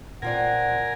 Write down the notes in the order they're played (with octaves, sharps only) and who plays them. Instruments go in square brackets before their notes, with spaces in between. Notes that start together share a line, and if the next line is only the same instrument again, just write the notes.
[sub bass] A#2 [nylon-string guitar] C4 F4 D5 [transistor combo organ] A#4 G#5 [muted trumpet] F#5